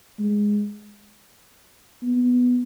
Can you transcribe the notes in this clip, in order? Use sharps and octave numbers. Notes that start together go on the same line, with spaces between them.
G#3
B3